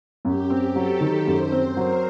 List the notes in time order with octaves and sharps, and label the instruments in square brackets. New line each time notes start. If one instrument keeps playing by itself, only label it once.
[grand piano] F#2 [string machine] G4
[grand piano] C4
[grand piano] F#3 [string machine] A4
[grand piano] D#3
[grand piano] F#2 [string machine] C5
[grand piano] C4
[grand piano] F#3 [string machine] A#4